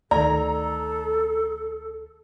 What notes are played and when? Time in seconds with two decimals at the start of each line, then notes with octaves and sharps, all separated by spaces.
0.11 D2 D#3 A4 D5 A#5